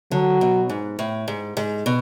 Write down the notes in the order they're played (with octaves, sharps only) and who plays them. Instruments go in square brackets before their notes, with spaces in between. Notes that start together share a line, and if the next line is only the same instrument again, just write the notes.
[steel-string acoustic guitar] D3 [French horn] F#3
[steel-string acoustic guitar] B2
G#2
A2
G#2
G#2
B2